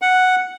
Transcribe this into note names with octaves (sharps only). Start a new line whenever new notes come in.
F#5